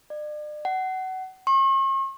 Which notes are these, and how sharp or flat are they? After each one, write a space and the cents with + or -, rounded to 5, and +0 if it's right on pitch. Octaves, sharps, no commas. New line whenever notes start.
D5 +40
F#5 +25
C#6 -45